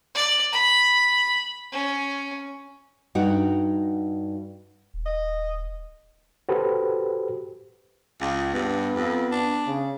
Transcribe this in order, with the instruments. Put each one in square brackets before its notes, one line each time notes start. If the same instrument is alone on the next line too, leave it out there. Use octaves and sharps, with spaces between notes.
[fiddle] D5
B5
C#4
[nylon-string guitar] G2 D#4 F#4 F#5 G5
[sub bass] D#1
[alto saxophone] D#5
[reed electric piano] F#4 G4 A4 B4 C5
[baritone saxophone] C#2
[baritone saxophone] G2 [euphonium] B3
[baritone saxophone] F2
D4
[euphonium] C#3